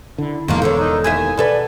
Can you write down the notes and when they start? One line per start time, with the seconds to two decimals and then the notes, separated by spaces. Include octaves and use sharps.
0.18 D3 E4
0.48 E1 E2 D#3 F3 A#3
0.62 D3 D#3 C#4 A4
0.80 D#4
1.04 D#2 D#5 E5 G#5
1.37 B2 A4 B4 D5